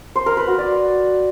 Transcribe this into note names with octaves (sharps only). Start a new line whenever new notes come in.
C5
A#4
B4
F#4
D5